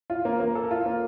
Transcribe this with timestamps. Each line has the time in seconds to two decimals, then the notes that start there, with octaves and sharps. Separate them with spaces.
0.10 F4
0.25 A#3
0.40 A#3
0.55 A4
0.71 F4
0.86 A#3